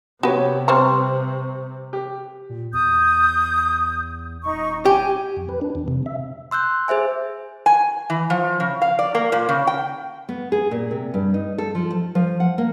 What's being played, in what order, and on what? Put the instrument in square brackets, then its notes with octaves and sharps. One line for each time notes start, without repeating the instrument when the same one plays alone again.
[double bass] C3 [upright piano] B3 G4 C#5 [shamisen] F#4 B4
[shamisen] G3 C4 A#5 [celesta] B4 C5 C6 [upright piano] C#6
[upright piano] G4
[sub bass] A#2
[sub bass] E2 [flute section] D#6 G6
[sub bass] D#1 [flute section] D#4 C#6
[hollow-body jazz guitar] G4 [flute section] G#5
[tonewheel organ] F2
B4
D4
E2
C3
E5
[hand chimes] C6 E6 F#6 G6
G#4 C5 E5 G#5
[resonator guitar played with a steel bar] G#5
E3
F3
C#3
F5
D5
A#3
A#2
C#3
G5
[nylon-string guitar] B3
G#4
A#2
C3
G2
D#4
A4
F3
A5
F3
F#5
A#3